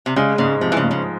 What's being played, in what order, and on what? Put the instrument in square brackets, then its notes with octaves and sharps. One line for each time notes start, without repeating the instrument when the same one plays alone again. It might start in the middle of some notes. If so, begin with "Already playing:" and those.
[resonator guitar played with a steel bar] C3
[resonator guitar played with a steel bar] C#3 [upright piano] G#3
[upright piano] G#2 [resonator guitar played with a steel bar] C#3
[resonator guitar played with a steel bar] C3 [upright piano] F3
[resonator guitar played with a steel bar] E3
C#3
[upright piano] G#2
[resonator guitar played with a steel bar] C#3